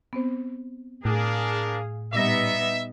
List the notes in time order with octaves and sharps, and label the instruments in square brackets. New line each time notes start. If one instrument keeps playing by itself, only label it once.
[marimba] B3 C4 C5
[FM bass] A2 [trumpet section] D4 A#4 [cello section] G#4 F5
[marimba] A#2 A#6 [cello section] G3 B3 D#4 [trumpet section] E5